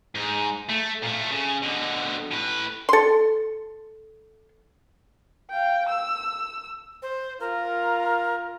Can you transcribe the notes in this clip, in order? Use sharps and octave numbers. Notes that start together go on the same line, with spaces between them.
G#2
A3
A#2 A3
C#3
B2 D3
A2 B4
A4 C6
F5 G5
E6
C5
F4 A#4